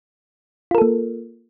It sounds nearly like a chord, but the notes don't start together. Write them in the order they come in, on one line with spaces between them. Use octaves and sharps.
F4 A#4 A4 A#3